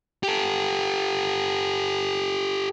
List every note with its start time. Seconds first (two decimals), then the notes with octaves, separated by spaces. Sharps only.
0.23 G4 A4